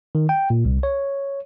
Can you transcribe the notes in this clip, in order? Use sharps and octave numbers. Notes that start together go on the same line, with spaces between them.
D#3
G5
A#2
C2
C#5